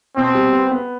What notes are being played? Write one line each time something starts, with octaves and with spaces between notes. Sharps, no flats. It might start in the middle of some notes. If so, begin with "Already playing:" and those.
B2 C4
G3
B3
B3